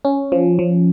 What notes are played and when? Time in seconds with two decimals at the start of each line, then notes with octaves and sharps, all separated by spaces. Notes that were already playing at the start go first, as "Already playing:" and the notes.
0.05 C#4
0.32 F3
0.59 F3